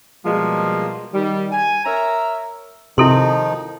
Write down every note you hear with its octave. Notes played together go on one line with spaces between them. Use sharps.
B2 F3 G3 G#3 A#3
D#3 G3
G#5
A#4 C#5 E5 A#5
C3 D#3 F3 D#4 E4 A4 C6